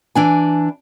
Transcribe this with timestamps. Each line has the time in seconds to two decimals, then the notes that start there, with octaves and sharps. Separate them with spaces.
0.15 E3 D4 G#5